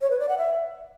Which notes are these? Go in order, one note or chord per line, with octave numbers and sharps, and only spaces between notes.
C#5
B4
D5
F#5
E5